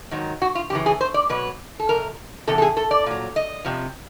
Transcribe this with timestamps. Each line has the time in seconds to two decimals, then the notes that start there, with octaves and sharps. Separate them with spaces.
0.11 G#2 D#3 F#3
0.42 F#4
0.55 F4
0.70 F#2 C#3 E3 G4
0.86 G#4
1.01 C5
1.14 D5
1.29 B2 F#3 B4
1.79 A4
1.89 F2 C3 A#4
2.48 E2 C3 A4
2.58 A4
2.62 G#4
2.77 A4
2.91 D5
3.06 A#2 F#3
3.36 D#5
3.65 F2 C3 F3